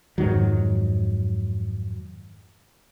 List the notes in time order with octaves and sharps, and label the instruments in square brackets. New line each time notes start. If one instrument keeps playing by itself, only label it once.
[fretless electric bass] F2 G#2 D#3 F#3